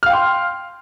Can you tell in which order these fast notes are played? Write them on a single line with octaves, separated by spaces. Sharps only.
F6 F5 G5 C6